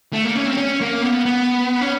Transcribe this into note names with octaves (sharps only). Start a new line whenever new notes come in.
A3
A#3
C#4
C4
C#4
A#3
B3
B3
C#4